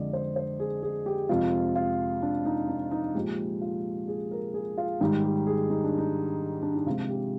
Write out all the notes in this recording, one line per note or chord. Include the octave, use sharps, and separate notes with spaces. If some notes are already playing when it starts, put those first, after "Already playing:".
Already playing: F2 D3 G#3 D5 D#5
C5
C5
G#4
G#4
G4
F2 C3 F3 G#3 F4
F4
D4
D#4
D#4
D#4
A#2 F3 G#3 G4
F4
G#4
A#4
G#4
F4
G#2 D#3 G3 D#4
G4
G#4
D#4
D4
D#4
D4
D#4
C3 F3 G#3 F4
G4